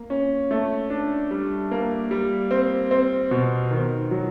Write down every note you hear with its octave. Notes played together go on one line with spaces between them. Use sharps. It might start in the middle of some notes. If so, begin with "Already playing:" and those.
Already playing: A#3
C#4
A3
D4
G3
A#3
G3
C4
C4
B2
D#3
F#3